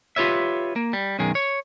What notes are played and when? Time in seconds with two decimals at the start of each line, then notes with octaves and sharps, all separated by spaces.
0.16 F4 G4 B4 C#5 E5
0.76 A#3
0.93 G3
1.19 B1 F#2 D#3 G#4
1.35 C#5